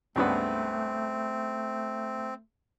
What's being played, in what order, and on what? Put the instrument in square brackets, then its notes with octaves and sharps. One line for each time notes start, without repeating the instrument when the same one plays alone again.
[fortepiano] C#2 G2 B3 [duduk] A3 [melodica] C4